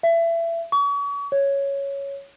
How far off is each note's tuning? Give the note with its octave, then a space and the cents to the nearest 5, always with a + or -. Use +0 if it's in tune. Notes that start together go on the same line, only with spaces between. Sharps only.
E5 +25
C#6 +40
C#5 +0